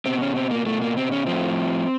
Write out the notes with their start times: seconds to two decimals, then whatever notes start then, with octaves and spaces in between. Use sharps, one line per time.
0.06 B2 C4
0.21 C#4
0.36 C4
0.51 A#3
0.66 B2 A3
0.82 A#3
0.97 C4
1.12 C#4
1.27 A2 F3 C4